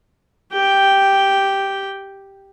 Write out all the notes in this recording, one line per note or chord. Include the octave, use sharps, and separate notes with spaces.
G4 G5